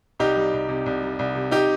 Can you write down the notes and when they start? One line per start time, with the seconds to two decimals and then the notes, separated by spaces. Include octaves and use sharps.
0.20 C2 D#4 G4
0.36 G3
0.54 C2
0.69 C3
0.86 C2
1.02 G3
1.19 C2
1.35 C3
1.51 D#4 G4